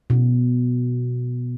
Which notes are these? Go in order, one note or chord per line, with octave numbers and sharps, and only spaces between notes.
B2